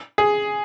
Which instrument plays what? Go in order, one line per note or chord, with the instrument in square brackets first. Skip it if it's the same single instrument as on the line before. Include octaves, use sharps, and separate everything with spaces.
[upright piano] G#4